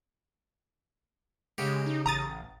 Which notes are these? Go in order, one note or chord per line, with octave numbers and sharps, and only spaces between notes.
C#3 G#3 G4
D#4
A1 A#5 D#6 A6